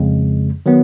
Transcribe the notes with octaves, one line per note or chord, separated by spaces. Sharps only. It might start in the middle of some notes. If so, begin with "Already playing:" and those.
Already playing: F2 C#3 G#3
D#3 F#3 B3